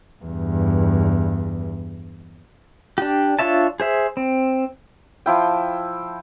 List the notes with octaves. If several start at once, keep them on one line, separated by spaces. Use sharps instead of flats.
E2 G2
D4 G4
D4 F4 C#5 E5 A5
G#4 C5 E5
C4
F3 E4 G5